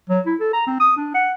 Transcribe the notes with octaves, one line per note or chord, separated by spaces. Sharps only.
F#3
E4
A4
A#5
C4
D#6
D4
F#5